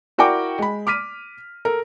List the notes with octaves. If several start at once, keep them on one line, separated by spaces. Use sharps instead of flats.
E4 F#4 A#4 D5 G5 D6
G#3 B5
D6 F6 B6 D#7
A4 A#4